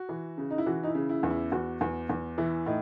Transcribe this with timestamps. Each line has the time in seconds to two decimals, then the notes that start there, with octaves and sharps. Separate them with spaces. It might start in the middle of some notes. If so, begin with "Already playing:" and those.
Already playing: F#4
0.09 E3
0.38 C#3
0.50 D#4
0.58 E4
0.66 E3 F#4
0.83 D#4
0.87 E4
0.95 C#3
1.09 E4
1.23 E2
1.30 E4
1.52 E2 F#4
1.81 E2
2.09 E2
2.38 E3 E4
2.66 A2 D#4